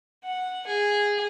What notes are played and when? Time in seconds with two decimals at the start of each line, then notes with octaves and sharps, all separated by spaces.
0.24 F#5
0.67 G#4